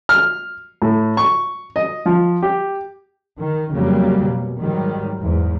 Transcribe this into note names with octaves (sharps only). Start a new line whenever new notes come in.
F6
A2
C#6
D#5
F3
G4
D#3
F2 C#3 F#3 G3 A#3
B2
G#2 D#3 F#3 G3
E2 G#2